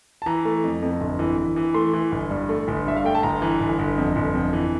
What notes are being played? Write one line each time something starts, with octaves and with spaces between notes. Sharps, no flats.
A5
E3 A#5
A3
F2
F2
G1
E3
E3
E3
A3 C6
E3
G1
G2
A3
G1
G2 E5
F5
A3 G5
A5
G1 A#5
E3
G1
G1
F2
G1
F2
E3